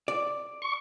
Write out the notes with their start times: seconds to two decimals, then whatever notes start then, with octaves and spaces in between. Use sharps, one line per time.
0.08 D5
0.62 C#6